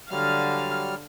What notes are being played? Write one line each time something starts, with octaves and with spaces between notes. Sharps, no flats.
D3 F#3 G3 F5 F6